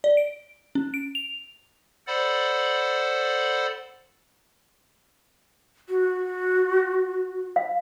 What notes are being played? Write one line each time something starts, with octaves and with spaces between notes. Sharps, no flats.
D5
D7
C#4
D7
F7
A4 C5 D5 F#5 B5
F#4
F5